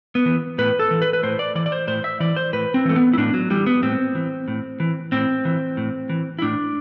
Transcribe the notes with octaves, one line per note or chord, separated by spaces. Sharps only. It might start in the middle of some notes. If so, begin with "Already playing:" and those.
B3
E3
A2 B4
A4
E3
B4
B4
A2 C5
D5
E3 D5
D5
C5
A2 C5
E5
E3 D5
C5
A2 B4
C4
E3 A3
B3
E4
A2 D4
F#3
E3 G3
B3
A2 C4
E3
A2
E3
A2 C4
E3
A2
E3
E4
A2 D4